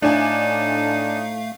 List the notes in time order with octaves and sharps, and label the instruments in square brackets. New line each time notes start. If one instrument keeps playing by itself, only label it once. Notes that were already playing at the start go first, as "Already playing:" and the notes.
[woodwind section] A2 [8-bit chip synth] A3 F5 [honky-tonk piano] D4 G#5 [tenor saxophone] D#4